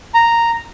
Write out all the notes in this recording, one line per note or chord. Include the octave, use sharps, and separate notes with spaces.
A#5